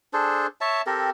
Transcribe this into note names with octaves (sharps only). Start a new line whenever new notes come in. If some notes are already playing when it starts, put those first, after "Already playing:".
D4 G#4 A4 C5
C#5 E5 A5
C4 G4 A4 A#4